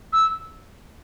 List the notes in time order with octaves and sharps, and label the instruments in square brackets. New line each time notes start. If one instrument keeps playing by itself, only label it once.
[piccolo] E6